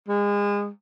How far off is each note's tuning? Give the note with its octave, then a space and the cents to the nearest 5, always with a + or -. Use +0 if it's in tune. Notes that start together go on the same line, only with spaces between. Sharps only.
G#3 -30